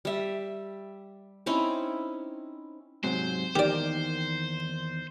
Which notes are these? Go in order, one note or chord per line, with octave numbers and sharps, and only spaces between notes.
G3 E5
C4 C#4 D#4 E4
G#2 C3 F#3 C5
E2 D#3 A#3 G4 D5